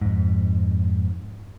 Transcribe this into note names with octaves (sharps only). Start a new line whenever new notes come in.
F2 G#2